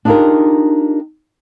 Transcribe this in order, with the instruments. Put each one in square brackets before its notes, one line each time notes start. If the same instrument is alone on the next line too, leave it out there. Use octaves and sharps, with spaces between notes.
[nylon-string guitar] D4 D#4 F4 G4 G#4 A#4